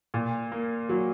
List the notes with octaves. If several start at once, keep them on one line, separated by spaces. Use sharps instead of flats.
A#2
A#3
F#3